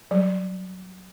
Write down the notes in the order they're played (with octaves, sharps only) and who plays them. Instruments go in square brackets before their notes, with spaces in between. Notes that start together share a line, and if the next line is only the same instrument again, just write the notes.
[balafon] F#3 G3